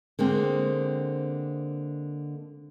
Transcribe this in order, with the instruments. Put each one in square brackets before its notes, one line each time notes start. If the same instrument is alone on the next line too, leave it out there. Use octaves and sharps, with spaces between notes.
[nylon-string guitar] D3 G#3 A#3 C4